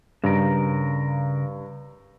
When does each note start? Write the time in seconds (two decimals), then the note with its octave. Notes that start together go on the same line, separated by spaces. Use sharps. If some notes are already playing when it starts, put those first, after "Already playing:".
0.24 G2 C#3 A#4